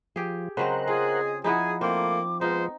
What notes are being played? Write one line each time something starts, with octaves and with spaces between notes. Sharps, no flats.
F3 G4 G#4
C#3 F#3 C4 A#4 C5 D#5 F#5
F4 G#4
F3 D#4 E4 F#4 G#4
A3 A#3 C4 F4 D6
G#3 B3 D#4 F4 C5